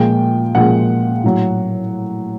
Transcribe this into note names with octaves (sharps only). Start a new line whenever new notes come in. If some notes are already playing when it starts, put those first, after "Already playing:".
Already playing: A#2 F3 G#3 G5
A#2 F3 G#3 F#5
A2 F#3